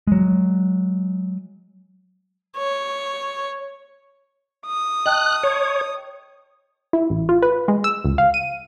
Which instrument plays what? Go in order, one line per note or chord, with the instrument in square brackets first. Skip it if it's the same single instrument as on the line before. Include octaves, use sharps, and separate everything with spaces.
[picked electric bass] F#3 G#3
[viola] C#5
[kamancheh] D#6
[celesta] D#5 G5 A5 [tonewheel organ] F#6
[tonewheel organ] C#5
[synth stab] E4
A1
F4
B4
G#3
E6
C#2
F5
D#7